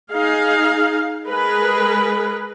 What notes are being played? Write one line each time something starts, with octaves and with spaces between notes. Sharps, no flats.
D#4 G#4 F5
G#3 G#4 A#4 B4